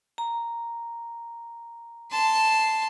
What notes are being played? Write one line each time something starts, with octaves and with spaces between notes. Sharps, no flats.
A#5
A5 C6